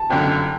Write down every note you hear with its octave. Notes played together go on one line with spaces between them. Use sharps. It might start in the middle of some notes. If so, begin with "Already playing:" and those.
Already playing: A5
G1 F#2 D3 G5